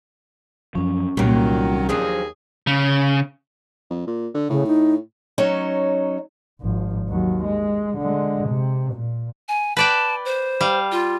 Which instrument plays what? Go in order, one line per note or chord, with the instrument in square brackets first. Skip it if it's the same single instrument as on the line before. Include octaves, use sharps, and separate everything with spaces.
[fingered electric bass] F#2 F3 [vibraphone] C#4
[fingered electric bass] C2 G3 [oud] A#2 A#3 [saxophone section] D#3 F#3
[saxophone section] D#2 G#4 [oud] F3 F#3 D4
[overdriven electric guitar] C#3
[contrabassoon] F2
A#2
D3
[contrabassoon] A2 [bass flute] C#3
[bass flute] D#4
[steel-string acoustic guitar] F#3 C#4 D#4
[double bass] G#1 F3
D#2 F#3
G#3
D3 G#3
C3
A#2
[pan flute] G#5
[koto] B4 D5 G5 [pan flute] A5
[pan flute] C5
[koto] G3 F5
[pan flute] F4